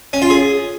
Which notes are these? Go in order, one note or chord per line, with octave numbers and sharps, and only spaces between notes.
C#4
F4
G#4